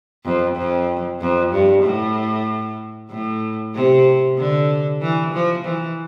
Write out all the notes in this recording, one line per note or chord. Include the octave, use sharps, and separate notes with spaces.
F2
F2
F2
G2
A2
A2
C3
D3
E3
F3
E3